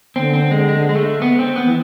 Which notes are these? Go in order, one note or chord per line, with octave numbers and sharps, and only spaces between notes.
D3 C4
C4
G#3
G#3
G#3
A3
B3
C4
B3
E3